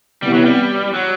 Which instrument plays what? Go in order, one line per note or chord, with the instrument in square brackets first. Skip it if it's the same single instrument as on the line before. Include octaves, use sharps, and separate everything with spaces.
[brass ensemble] C3 E3 B3 [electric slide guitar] G3
[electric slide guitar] F#3
G3
F#3